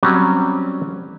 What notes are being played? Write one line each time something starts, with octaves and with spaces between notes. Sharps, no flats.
F#3 G3 C4 C#4